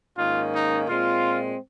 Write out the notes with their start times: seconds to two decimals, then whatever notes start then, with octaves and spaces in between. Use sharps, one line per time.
0.16 G#2 D#3 A#3 C#4 F4
0.52 D#4
0.87 A#2 G#3 C4 F4